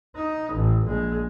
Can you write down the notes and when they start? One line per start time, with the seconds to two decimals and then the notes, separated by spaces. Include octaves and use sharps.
0.16 D#4
0.54 A1
0.87 A#1 G#3